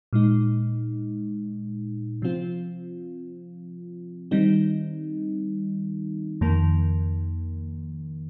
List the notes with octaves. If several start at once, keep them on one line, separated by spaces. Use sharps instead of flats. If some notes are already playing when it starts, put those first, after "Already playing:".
A#2 G#3 D#4
C3 F3 C4 F4
D#3 G3 C4 D#4
F2 D#3 A#3